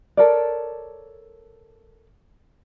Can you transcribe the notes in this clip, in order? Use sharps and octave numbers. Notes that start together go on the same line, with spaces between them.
A4 A#4 C#5 D5